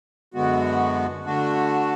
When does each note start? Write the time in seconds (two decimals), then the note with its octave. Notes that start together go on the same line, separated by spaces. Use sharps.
0.34 F#2 D3 G#3 B3 F#4
1.25 D3 A3 D4 F#4